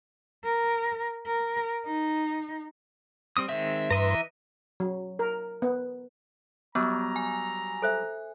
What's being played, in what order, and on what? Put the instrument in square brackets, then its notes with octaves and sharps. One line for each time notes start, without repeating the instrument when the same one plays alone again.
[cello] A#4
A#4
D#4
[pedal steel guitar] G3 C4 D#6
[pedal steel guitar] D#3 G#3 C4 [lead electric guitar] E5
[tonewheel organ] G2 B4 C6 [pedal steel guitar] E3 D#5 A#5
[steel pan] F#3
A#4
B3
[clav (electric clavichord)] F#3 G3 [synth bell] B3 [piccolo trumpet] A#5
[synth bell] G#5
[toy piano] A4 C5 E5